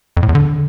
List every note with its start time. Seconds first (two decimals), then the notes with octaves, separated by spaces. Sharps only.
0.17 F2
0.23 A2
0.29 E2
0.35 D3